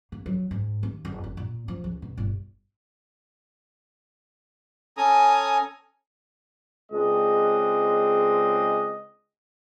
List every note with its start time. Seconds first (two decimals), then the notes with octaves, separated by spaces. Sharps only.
0.12 A#3
0.26 F#3
0.51 G#2
0.83 D#2
1.05 F#1
1.24 F#1
1.37 A#2
1.68 F3
1.84 C#2
2.02 B2
2.17 G1
4.97 C#4 A4 G#5 A#5 D#6
6.92 C#2 G#3 C4 D4 D#5